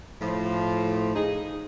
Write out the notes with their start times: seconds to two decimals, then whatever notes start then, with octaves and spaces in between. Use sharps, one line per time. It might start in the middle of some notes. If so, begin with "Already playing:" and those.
0.22 A2 F3
1.15 D#4 G#4